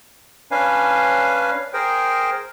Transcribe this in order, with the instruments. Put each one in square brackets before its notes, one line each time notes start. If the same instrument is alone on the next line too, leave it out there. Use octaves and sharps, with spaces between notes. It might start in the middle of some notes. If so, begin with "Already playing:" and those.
[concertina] C#4 D4 B4 F5 G#5
G#4 A#4 C5 G5